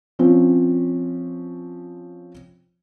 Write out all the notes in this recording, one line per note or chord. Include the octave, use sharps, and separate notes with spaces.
F3 C4 C#4